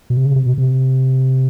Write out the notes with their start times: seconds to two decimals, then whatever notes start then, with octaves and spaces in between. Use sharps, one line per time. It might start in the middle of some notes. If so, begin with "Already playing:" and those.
0.10 B2
0.17 C3
0.25 C#3
0.36 C3
0.46 B2
0.58 C3